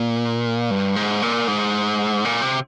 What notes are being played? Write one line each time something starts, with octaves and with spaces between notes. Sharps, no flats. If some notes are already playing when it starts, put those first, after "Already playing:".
Already playing: A#2
G2
G#2
A#2
G#2
A#2
C3